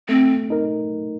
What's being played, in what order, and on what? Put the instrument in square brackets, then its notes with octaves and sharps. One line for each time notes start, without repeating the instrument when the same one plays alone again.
[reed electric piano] A3 [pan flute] C4
[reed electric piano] D#4 A#4